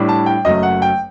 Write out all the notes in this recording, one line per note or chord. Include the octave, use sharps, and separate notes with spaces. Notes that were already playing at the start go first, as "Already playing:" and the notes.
Already playing: A2 G3 D4
A5
G5
F#1 F#2 F#3 A3 D#5
F#5
G5